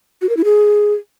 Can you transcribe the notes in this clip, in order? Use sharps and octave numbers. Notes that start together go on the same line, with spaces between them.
F#4
A#4
E4
G#4